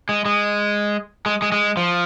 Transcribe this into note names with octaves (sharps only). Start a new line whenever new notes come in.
G#3
G#3
G#3
G#3
G#3
F3